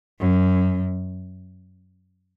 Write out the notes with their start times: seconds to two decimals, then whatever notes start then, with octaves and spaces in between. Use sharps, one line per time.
0.21 F#2